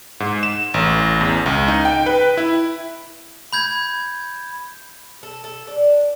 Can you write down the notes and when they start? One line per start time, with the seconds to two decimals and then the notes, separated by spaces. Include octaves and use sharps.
0.20 G#2
0.43 E7
0.74 A1
1.21 E2
1.46 C#2
1.68 D#4
1.85 G5
2.06 B4
2.37 E4
3.53 B5 G6 G#6
5.23 A4
5.44 A4
5.67 D4